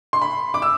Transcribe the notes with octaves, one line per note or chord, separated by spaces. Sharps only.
C6
B5
D6
E6